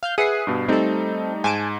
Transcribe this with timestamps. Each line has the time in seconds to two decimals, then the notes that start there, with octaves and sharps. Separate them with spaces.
0.03 F5 F6 G6
0.18 G#4 B4 E5 F#5 D#6 C7
0.47 G2 B2
0.68 G3 A3 C4 D#4 A4
1.44 G#2 G#5 A5 D7